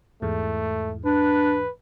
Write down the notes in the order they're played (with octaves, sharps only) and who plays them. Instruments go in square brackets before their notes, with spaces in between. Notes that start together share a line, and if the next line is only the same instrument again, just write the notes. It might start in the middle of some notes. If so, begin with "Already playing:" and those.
[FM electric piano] E2 G#2 [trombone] A3
[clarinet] D4 [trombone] B4